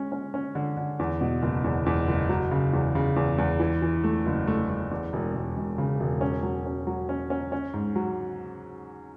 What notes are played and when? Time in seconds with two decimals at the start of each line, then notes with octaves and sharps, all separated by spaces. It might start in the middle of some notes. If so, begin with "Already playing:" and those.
Already playing: G#3 C#4
0.12 C#4
0.34 C#4
0.55 D3
0.77 D3
0.99 E2
1.21 B2
1.42 F#1
1.64 E2
1.86 E2
2.08 F#1
2.29 F#3
2.51 C#3
2.73 E2
2.95 C#3
3.16 E2
3.38 E2
3.60 E3
3.82 E3
4.04 A3
4.26 F#1
4.47 A3
4.69 A3
4.91 E2
5.13 E1
5.34 E1
5.57 E1
5.78 C#3
6.00 E1
6.21 C#4
6.43 F#3
6.66 C#4
6.87 F#3
7.09 C#4
7.30 C#4
7.52 C#4
7.74 G#2
7.96 F#3